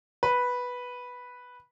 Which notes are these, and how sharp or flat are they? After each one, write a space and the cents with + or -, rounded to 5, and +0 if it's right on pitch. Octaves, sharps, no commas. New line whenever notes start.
B4 -5